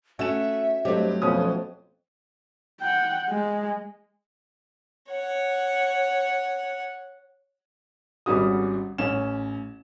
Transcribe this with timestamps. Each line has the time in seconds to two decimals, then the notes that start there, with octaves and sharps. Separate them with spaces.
0.19 A3 C#4 F#4 E5 E7
0.85 G2 F#3 A3 C4 G4 C5 D#5
1.22 F2 B2 C#4 D#6
2.81 F#5 G5
3.30 G#3
5.09 C#5 F#5
8.26 G#1 G3 C#4 F#4 D#6
8.98 A1 C#4 E7